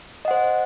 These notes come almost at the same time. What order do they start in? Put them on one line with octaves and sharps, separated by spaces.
D#5 F#5 C5